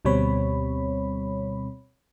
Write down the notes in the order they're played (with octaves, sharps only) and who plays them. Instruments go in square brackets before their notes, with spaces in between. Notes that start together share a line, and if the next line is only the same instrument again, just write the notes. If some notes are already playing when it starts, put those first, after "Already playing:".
[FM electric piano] D2 B2 G3 C4 C#5 B5